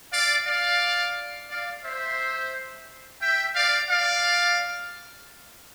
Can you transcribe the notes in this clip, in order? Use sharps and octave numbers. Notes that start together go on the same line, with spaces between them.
D5 F5
D5 F5
D5 F5
C5 E5
E5 G5
D5 F5
D5 F5